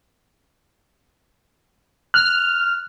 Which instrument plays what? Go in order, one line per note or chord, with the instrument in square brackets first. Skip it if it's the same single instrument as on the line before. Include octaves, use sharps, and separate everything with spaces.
[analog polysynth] F6 [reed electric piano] F#6